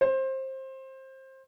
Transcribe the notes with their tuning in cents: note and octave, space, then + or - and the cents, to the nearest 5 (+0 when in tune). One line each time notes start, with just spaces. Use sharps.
C5 +20